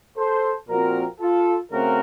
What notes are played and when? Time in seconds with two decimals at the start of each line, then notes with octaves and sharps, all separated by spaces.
0.17 A4 C5
0.68 A#2 F3 C4 F#4 A#4
1.20 F4 A4
1.71 C#3 A3 C4 F#4 A#4